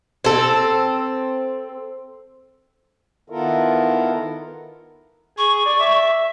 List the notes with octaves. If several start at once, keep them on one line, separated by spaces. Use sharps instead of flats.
C4 A4
D#3 B3 E4 F4 A4 A#4
G#4 C#6
D5
E5